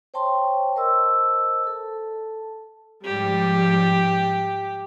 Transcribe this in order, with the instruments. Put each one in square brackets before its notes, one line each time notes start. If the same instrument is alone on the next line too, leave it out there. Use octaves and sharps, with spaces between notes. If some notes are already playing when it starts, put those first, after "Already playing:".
[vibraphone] C5 C#5 G5 A5 C6 C#6
A#4 C5 D#5 A5 E6
A4 A5
[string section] G#2 F3 G3 [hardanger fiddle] G4